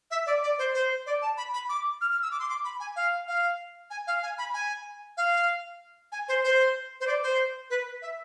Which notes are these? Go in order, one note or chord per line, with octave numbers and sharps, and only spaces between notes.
E5
D5
D5
C5
C5
D5
A5
B5
B5
D6
F6
F6
E6
D6
C6
D6
B5
G#5
F5
F5
G#5
F5
G#5
B5
G#5
F5
G#5
C5
C5
C5
D5
C5
B4
E5